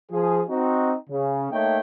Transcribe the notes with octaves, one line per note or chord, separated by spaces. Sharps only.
F3 G#4
C4 D#4 F#4
C#3
A3 A#3 D#4 C#5 E5 G5